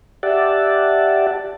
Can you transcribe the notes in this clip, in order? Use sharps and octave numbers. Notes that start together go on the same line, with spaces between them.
G4 D5 E5 F#5 A5